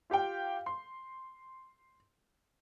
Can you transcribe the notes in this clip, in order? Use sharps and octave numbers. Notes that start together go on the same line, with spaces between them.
F4 G4 F5 G5
C6